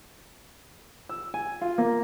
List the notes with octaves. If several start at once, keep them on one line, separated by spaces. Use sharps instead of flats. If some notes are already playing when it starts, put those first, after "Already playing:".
E6
G#5
F4
A#3